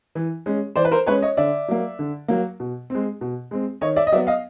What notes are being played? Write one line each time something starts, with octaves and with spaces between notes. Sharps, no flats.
E3
G#3 C#4
E3 C5 D5
B4
A#4 C5
G#3 C#4 B4 C#5
C#5 D#5
D3 D5 E5
F#3 A#3
D3
F#3 A#3
B2
G#3 C4
B2
G#3 C4
D#3 C#5 D#5
D5 E5
D#5
F#3 B3 D5 E5
D#5 F5